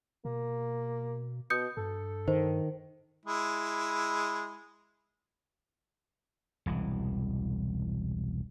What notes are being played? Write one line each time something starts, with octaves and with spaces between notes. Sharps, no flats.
B2 A#3
B2 D#6 G6 C#7
G2 A4
D#3 C5
G#3 E4
E1 C2 E3